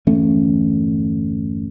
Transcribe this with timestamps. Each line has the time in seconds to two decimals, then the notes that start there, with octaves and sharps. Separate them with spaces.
0.07 G1 E2 A3 C#4